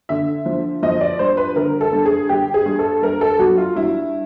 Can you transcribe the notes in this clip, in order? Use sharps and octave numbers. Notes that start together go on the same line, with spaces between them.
D3 E5
F3
F3 D#5
D5
G2 C5
B4
D3 A#4
A4
G2
G#4
G2 G4
G#4
G2
A4
G2 A#4
A4
F#3 F#4
F4
G2 E4